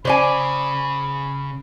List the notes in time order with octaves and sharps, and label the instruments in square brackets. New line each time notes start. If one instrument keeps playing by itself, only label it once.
[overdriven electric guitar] C#3 [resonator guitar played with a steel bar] C5 D5 G#5 [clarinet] B5